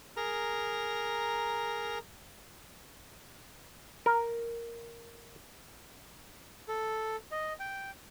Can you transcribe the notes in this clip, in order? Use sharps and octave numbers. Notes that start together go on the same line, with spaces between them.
G#4 A#4 A#5
A#4
A4
D#5
G5